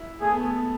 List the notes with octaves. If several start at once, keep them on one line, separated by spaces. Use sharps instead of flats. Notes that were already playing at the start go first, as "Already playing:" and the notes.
Already playing: E4
A3 G#4
B3
A3